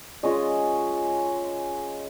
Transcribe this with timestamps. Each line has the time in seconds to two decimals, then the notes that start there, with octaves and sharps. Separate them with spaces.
0.23 G#3 C#4 F4 D#5